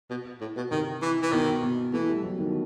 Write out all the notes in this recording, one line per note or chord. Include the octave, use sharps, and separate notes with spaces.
B2
A2
B2
C3 D#3
E3
E3
B2 D#3
B2
E3 A3
G3
F#3
D#3